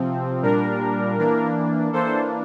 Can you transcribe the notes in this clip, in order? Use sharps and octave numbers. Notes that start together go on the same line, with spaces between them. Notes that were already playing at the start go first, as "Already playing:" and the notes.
Already playing: C3 F3 C4
A#2 G3 D4 A#4
E3 A#3 D4
E3 A#3 D4 A4 C5